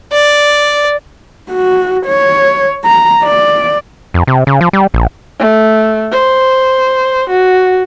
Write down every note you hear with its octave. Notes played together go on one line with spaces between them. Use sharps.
D5
F#4
C#5
A#5
D5
F2
C3
C#3
F3
G3
A#1
A3
C5
F#4